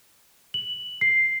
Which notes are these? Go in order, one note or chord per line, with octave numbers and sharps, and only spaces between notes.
F#7
C7